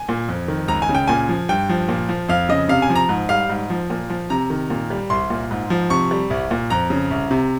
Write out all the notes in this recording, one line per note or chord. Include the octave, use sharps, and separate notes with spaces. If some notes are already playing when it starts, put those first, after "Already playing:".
Already playing: G#5
A#2
F2
D#3
C#2 A#5
G#5
C#3
G5
A#2 G#5
F3
G2 G5
F3
A#2
F3
F2 F5
C#3 D#5
C3 F5
G#5
F3
A#5
G#2
G3 F5
G#2
F3
A#2
F3
C3 A#5
D#3
A#2
G3
C2 C6
A#2
G#2
F3
C3 C#6
G3
C2
A#2
F2 A#5
C#3
C2
C3